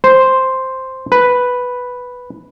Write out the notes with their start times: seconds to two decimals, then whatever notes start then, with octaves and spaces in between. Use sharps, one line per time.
0.04 C5
1.12 B4